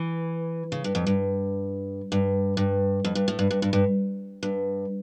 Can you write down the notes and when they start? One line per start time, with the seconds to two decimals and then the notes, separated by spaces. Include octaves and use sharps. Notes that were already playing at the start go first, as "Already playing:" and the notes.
Already playing: E3
0.72 C#3
0.84 G2
0.95 F2
1.07 G2
2.12 G2
2.57 G2
3.05 F2
3.15 G2
3.28 A2
3.39 G2
3.51 G2
3.62 G2
3.73 G2
4.43 G2